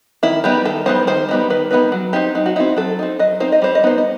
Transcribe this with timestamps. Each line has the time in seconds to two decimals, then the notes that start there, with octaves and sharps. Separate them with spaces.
0.23 D#3 E4
0.44 G3 B3 D#4 G4
0.65 D#3 A4
0.86 G3 B3 D#4 C5
1.07 D#3 C5
1.29 G3 B3 D#4
1.50 D#3 B4
1.71 G3 B3 D#4 B4
1.92 F#3
2.13 C4 D#4 G4
2.35 F#3 D#4
2.46 F#4
2.56 C4 D#4 E4
2.77 F#3 A4
2.99 C4 D#4
3.19 F#3 D#5
3.40 C4 D#4 C5
3.52 D#5
3.62 G3 C5
3.75 D#5
3.83 B3 D#4 C5
3.98 D#5